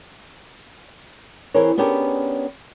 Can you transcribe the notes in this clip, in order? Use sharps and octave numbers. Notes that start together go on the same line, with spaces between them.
E3 C4 G#4 A#4 C#5
B3 C#4 D4 G4 G#4 A#4